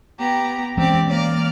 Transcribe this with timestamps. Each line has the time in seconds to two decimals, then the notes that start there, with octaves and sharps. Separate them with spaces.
0.19 B3 G4 A#5
0.77 E3 G#3 C4 C#4 G4 D5
1.08 A#3 D5 F6